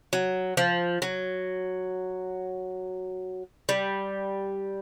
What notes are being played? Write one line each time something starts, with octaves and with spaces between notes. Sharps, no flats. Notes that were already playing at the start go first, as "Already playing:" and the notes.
F#3
F3
F#3
G3